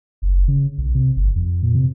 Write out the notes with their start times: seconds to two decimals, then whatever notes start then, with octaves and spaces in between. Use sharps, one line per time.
0.22 F#1
0.48 C#3
0.78 B1
0.95 C3
1.16 G1
1.36 F2
1.63 A#2
1.75 C3